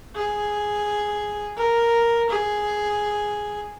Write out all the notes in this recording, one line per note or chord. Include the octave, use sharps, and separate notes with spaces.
G#4
A#4
G#4